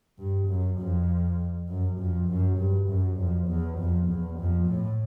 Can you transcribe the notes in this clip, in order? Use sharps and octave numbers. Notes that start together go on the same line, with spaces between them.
G2
F#2
F2
F#2
F2
F#2
G2
F#2
F2
E2
F2
E2
F2
A2